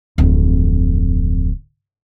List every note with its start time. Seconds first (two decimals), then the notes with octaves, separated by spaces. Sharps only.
0.18 D1 F2